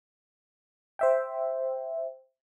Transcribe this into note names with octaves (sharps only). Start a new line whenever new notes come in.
C5 E5 G5